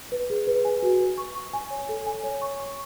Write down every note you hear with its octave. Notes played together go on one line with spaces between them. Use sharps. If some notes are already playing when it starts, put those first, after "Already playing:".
B4
G#4
B4
G#5
F#4
B4
C#6
C#6
G#5
C#5
A4
G#5
C#5
C#6
C#6